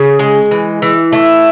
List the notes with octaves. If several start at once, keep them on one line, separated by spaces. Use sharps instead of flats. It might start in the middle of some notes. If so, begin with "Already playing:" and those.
Already playing: C#3
G#3
E3
E3
A3